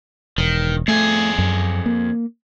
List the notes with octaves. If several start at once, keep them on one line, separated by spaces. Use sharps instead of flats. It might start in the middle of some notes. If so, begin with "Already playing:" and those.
E1 D#3
F2 A3 G#4
F#2
A#3